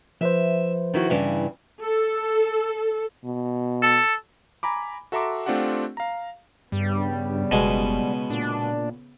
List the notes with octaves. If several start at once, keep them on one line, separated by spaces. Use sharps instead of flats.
F3 B4 C5 E5
D#3 E4 F#4
G2 C#3 E3
A4
B2
A4
G#5 A#5 B5 D6
F#4 A4 E5 A#5 C6 D6
A3 C4 D4 F4 G4 F#5
F5 A#5
G2 C#3 G3 B3
F#1 B2 G#3
A#2 D4